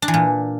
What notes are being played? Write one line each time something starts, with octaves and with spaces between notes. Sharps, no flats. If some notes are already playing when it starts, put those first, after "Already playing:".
D4
E3
A#2